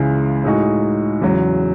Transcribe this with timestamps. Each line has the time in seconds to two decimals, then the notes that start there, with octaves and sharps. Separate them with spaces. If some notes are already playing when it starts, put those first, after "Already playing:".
Already playing: C#2 C#3 E3 G#3
0.44 A2 G#3 D#4 F#4
1.22 E2 C#3 F#3